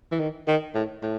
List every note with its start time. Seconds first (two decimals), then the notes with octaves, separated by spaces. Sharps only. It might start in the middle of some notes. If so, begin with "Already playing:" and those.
0.11 E3
0.20 D#3
0.48 D#3
0.74 A2
1.03 A2